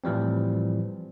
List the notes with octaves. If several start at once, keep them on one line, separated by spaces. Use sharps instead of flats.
A2 E3 F3 G3 C4